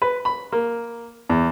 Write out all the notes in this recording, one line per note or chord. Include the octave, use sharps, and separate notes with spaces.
B4
B5
A#3
E2